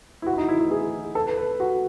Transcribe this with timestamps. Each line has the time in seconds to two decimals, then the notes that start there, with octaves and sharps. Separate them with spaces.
0.22 E4
0.26 F#4
0.33 E4
0.38 D#4
0.49 E4
0.59 E4
0.71 G#4
1.15 A4
1.26 B4
1.37 B4
1.60 F#4